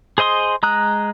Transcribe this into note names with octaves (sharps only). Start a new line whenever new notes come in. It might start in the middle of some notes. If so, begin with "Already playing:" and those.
G#4 C5 D#5 C6 D#6
G#3 A#5 D#6 F#6